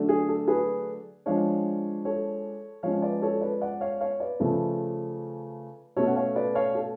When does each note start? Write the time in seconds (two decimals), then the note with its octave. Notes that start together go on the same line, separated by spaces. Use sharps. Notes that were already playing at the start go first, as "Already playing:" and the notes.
Already playing: D3 F#3 A3 D4
0.09 G#4
0.29 A4
0.48 G#4 B4
1.26 F3 G#3 D4 C#5 F5
2.05 A4 C#5
2.83 F3 G#3 C#4 C#5 F5
3.02 B4 D5
3.22 A4 C#5
3.41 B4 D5
3.61 D5 F#5
3.81 C#5 F5
4.01 C#5 F5
4.20 B4 D5
4.40 C#3 F3 A3 C#4
5.96 B2 A3 C#4 A4 C#5
6.07 F#5
6.16 C#5 F5
6.35 B4 D5
6.55 C#5 F5
6.75 A4